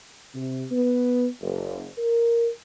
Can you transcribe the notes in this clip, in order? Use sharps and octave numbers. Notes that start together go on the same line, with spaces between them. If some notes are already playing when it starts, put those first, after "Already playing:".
C3
B3
F#1
A#4